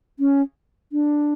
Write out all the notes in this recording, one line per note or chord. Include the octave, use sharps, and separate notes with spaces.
C#4
D4